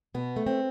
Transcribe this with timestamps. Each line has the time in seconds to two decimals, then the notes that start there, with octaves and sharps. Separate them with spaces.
0.14 B2 B3
0.36 A3
0.46 C4